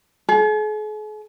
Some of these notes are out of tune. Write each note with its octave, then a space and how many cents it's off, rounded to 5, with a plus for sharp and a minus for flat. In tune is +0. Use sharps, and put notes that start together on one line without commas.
G#4 +45